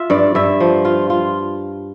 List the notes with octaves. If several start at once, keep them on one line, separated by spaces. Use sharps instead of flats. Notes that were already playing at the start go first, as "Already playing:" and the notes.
Already playing: F4 E5
G2 D5
G2 E5
F3
F4
F4